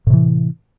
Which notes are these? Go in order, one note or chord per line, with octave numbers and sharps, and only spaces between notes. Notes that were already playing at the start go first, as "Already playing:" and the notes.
A2 C3 E3